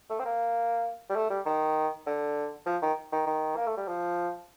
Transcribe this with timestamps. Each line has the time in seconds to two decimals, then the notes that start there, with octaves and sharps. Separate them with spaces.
0.10 A3
0.19 C4
0.25 A#3
1.10 G3
1.16 A3
1.30 G3
1.46 D#3
2.07 D3
2.66 F3
2.82 D#3
3.12 D#3
3.27 D#3
3.56 A#3
3.67 A3
3.77 G3
3.88 F3